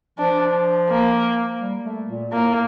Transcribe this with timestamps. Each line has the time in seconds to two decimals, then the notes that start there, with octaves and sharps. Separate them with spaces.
0.18 F3 D4
0.90 A#3
1.61 G3
1.85 A3
2.09 A#2
2.33 A2 A#3